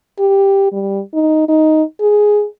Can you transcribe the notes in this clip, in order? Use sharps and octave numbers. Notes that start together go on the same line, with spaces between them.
G4
G3
D#4
D#4
G#4